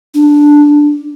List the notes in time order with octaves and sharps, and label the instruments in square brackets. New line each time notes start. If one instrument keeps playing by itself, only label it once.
[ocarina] D4